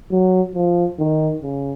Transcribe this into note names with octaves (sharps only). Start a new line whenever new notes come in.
F#3
F3
D#3
C#3